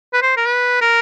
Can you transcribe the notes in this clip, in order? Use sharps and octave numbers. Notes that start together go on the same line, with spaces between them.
B4
C5
A#4
B4
A#4